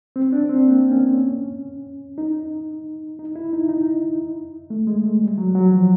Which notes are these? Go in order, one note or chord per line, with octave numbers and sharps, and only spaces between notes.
C4
D4
C4
A#3
C#4
D#4
D#4
E4
D#4
D#4
A3
G#3
A3
G3
F#3
F#3
F3